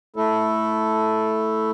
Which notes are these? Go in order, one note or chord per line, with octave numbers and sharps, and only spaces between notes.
A3 E4 A4